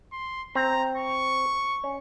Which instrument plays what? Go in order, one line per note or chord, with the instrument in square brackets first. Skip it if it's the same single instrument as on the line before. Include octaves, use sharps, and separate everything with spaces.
[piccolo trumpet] C6
[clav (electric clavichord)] C4 [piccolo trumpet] A#5
[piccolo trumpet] C#6
[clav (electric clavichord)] C#4